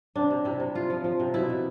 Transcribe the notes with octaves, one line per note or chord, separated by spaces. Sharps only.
C3 D4
C3
C3 E4
C3
F3 F4
F3
F3
C3
B2 E4
B2